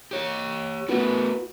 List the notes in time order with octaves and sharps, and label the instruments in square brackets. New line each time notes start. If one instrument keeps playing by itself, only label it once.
[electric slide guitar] G4 C#5
[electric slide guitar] A3 B3 [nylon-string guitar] E4 F#4 B4